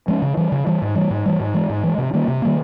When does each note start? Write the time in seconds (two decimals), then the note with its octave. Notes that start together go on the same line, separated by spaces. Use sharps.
0.08 F3 G#3 C#4
0.22 C#3
0.37 E3 G3
0.52 C#3
0.67 E3 G3
0.82 G#2
0.95 E3 G3
1.10 G#2
1.26 E3 G3
1.40 G#2
1.54 E3 G#3
1.69 G#2
1.83 E3 G#3
1.98 C3
2.13 D#3 G3 A#3
2.28 C3
2.42 D#3 G3 A#3